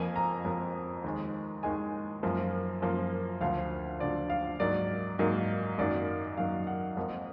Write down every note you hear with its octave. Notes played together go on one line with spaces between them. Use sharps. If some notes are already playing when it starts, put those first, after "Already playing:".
Already playing: F2 F3 A#3 G#5
A#5
F2 F3 A#3
D#2 D#3 G#3
D#2 D#3 G#3 G#5
F#2 F3 A#3
F#2 F3 A#3
D2 D3 F3 F5
D2 D3 F3 D5
F5
G#2 F#3 A#3 D5
G#2 F#3 A#3
F#2 D#3 F#3 A#3 D5
F#2 D#3 F#3 A#3 F5
F#5
F2 F3 A#3